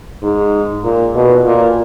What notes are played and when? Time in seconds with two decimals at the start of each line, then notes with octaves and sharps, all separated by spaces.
0.23 G#2
0.84 A#2
1.15 B2
1.45 A#2